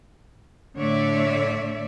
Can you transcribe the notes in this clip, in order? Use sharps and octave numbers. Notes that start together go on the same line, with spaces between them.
A2 D3 A3 C#5 D5 E5